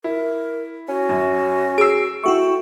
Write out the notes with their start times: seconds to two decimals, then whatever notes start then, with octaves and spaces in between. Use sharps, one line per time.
0.04 E4 A#4
0.88 C#4 F#4
1.09 F#2
1.78 G#4 E6 C7 D7
2.24 A3 E4 F#4 G5 C#6